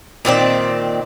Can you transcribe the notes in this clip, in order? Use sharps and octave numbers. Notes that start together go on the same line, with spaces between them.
A#2 D#3 C4 D5